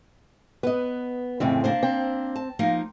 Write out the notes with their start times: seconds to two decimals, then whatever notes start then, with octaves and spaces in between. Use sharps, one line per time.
0.63 B3 B4 D#5
1.40 F2 A2 C#3 E3 C4 E5
1.64 A#3 D4 C5
1.83 C4
2.35 A5
2.59 F3 A#3 D#4